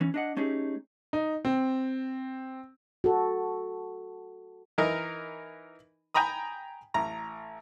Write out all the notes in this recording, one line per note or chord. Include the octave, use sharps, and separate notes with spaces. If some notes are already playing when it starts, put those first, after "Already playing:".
E3 C#4
D4 D#5 F#5
A3 C#4 D#4 G4 G#4
D#4
C4
F#4 A4
E3 D#4 A#4
G5 G#5 A#5 B5 D#6
A1 A#5